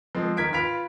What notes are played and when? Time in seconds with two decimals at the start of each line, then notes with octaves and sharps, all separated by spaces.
0.15 F3 G#3 C4
0.37 D#3 A#4 G#6 B6 D7
0.53 F4 B4 B5 B6 D7 F7